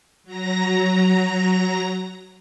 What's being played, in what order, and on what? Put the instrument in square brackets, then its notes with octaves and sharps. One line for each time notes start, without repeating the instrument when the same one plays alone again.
[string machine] F#3 A#5 A#6